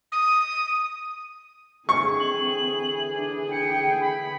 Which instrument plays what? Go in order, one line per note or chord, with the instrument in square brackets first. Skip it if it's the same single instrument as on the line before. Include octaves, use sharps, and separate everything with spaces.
[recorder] D#6
[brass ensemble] D3 E3 G#4 [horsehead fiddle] C4 [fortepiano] C#6
[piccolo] F#7
[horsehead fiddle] D4
[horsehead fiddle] G5 [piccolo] C#7
[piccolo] B5